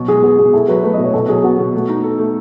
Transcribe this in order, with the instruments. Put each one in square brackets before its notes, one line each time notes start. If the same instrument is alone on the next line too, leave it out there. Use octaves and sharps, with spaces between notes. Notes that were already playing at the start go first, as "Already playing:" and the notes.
Already playing: [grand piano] B2 F#3
[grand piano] G#3 [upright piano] G#4
[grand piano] B3 [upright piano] G#4
[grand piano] B2 [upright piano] G#4
[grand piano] E4 [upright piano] A4
[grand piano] F#3 [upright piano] B4
[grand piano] A3 [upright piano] B4
[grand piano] B2 [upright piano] D#5
[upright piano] C#5
[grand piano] B2 [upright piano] A4
[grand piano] F#3 [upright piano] G#4
[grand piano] B3 [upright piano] F#4
[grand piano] B2
A3
D#4
A4
A3